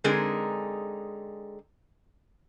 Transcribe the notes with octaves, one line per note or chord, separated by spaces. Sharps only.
D3 G#3 C4 D#4 G#4 A#4